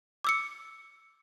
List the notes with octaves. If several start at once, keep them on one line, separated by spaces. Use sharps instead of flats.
D6 E6 C#7